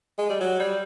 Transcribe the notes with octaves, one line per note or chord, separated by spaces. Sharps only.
G#3
G3
F#3
G3